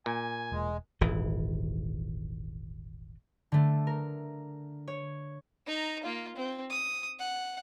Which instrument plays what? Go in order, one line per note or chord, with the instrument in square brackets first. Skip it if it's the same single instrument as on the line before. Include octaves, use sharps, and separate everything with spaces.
[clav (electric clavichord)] A#2 [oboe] G#5
[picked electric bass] E1 [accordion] G#3
[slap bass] D#1 G#1 E3
[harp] D3 A3
A#4
C#5
[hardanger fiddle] D#4 A#5
A#3 F4
C4
D#6
F#5